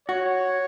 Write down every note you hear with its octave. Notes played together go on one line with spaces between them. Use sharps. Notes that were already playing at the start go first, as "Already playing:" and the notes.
F#4 C#5